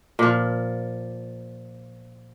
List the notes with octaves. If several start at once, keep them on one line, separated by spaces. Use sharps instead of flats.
A#2 F3